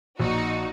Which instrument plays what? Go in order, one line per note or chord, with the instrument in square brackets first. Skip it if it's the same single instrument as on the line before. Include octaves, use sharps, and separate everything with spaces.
[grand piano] A#1 [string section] D#4 F#4